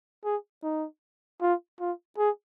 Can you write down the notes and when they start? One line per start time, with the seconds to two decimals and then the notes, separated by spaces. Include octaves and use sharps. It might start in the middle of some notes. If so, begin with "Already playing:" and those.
0.24 G#4
0.63 D#4
1.42 F4
1.80 F4
2.18 G#4